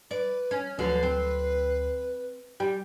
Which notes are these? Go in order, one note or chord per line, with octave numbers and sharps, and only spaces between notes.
B4 D5
C#4
D2 D3 F3 F#3 B4 C7
C4
G3 G5